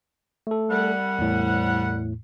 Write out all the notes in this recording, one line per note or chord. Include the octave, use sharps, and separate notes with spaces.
A3 A4
C2 G3 F#5
E2 A2